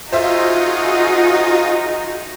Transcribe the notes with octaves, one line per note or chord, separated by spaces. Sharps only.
D#4 F4 F#4 G#4 C5 E5